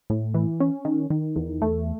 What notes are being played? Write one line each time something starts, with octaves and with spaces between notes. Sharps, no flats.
A2
E3
C#4
D#3
D#3
E2
A3